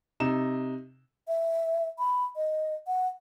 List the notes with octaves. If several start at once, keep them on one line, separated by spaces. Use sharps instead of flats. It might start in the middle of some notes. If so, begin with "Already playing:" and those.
C3 D#4 E7
E5
B5
D#5
F#5